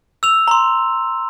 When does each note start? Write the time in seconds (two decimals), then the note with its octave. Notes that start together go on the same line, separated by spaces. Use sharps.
0.23 E6 F7
0.48 A#5 C6